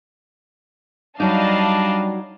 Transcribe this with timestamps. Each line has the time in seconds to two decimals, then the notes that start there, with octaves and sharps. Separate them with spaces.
1.20 F#3 G3 D4 D#4 D#5 F5 A5